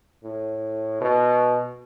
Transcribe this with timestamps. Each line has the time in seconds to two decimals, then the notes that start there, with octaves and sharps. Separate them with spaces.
0.24 A2
1.01 B2